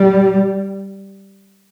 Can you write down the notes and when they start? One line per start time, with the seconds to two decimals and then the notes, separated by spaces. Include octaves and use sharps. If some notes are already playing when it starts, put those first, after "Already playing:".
Already playing: G3